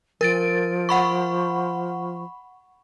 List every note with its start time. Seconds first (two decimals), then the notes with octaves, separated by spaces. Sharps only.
0.21 F3 A#4 A6 D7
0.89 F#5 B5 C#6